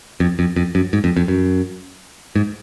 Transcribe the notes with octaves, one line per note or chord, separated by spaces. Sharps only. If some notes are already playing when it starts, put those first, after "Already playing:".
F2
F2
F2
F#2
G#2
F2
F2
F#2
G#2